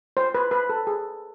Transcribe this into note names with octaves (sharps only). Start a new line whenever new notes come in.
C5
B4
B4
A4
G#4